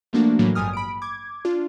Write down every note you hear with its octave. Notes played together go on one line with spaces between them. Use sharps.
F3 A3 A#3 D4 F#4
A2 E3 F#3 A#3
G#1 G2 G#5 D#6 F6
B5 D7
D6 G#6
D4 F4